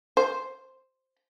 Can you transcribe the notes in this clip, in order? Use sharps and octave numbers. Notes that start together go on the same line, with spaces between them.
C5